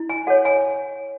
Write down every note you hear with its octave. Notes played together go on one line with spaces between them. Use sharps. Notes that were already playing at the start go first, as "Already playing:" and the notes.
Already playing: E4
G#5
A4 C#5 F#5
G#5